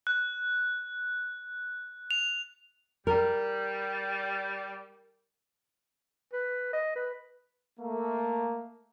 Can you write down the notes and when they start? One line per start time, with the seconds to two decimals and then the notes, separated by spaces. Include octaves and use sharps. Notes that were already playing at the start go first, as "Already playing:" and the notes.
0.07 F#6
2.11 F7
3.07 G3 A#4
6.33 B4
6.73 D#5
6.96 B4
7.80 A3 A#3